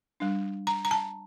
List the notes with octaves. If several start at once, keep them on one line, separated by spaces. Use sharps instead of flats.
G3 D4
A#5
A#5
A5